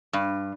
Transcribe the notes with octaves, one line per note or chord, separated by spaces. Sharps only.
G2